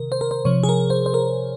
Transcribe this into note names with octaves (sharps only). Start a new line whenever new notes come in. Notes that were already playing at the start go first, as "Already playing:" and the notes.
Already playing: C3 D#3 A#4
C5
A#4
C5
C3 F3 C#5
G#4
A#4
C5
C5
A#4